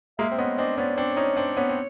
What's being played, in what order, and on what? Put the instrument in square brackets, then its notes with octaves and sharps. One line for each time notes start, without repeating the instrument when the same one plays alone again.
[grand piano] G#3 A#3 [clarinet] E5
[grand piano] C4
[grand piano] B3 C#4 [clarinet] D#5
[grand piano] C4 D4 [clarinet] D#5
[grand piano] B3 C#4 [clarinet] D5
[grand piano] C4 D4 [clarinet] C#5
[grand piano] C#4 D#4
C4 D4
B3 C#4
C4